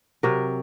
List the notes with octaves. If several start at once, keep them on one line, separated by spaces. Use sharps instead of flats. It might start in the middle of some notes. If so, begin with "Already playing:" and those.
C3 F#3 A#4